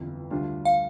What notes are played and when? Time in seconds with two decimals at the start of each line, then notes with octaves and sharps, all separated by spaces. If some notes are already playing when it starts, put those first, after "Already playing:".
Already playing: G1 F2 E3
0.30 D2 D3 G3 D4 F4
0.65 F5